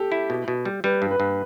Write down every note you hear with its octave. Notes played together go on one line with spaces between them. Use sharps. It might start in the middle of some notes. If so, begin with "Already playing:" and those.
Already playing: G4 A4
E4
B2
B2
G3
G3 B4
G2
B4
G2